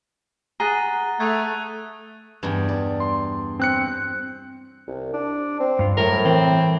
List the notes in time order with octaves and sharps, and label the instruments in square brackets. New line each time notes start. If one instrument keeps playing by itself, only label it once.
[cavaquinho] G#4 F#5 [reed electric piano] A#5 [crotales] A6 D#7 G7
[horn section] A3 [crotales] D#6 F#6 G#6
[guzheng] E2 G2
D5
[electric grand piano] C6
C4 F#6 C#7
[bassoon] C2
D4
C4
[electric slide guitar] G2 F4
[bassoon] A2 [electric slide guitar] F#3 G3 [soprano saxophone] A#4
[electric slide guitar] E3 [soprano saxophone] C4